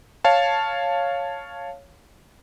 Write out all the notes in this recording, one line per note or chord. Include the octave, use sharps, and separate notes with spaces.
C#5 F5 A5